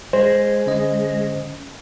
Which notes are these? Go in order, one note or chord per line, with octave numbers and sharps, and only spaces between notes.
G#3 C5
D3 C#4 D#5